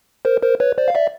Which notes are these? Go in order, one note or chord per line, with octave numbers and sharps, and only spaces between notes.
A#4 C5
A#4 C5
B4 C#5
C5 D5
F5
D5 E5